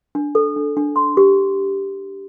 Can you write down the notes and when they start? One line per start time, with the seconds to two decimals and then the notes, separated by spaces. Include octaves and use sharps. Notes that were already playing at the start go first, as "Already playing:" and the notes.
0.15 D4
0.35 A4
0.56 D4
0.77 D4
0.96 C6
1.17 G4